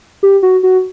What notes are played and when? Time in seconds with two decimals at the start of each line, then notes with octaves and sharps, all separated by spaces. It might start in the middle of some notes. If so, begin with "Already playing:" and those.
0.23 G4
0.43 F#4
0.63 F#4